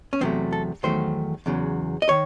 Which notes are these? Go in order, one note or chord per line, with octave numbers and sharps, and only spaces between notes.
C#4
E2 C3 F#3 A3 C4
A4
E2 D#3 F#3 A3 C5
E2 C#3 F#3
D#5
D#3 C#5